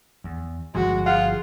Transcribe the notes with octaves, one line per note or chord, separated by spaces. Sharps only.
E2
G1 F3 G#3 F#4
F4 G#4 F#5